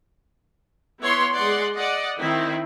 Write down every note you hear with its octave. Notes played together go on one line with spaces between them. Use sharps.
B3 E4 C#5 C6
G#3 D5 F#5 C6
D5 D#5 F#5
D#3 C4 E4